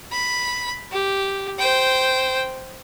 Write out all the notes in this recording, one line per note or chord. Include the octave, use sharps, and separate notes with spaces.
B5
G4
C5 G5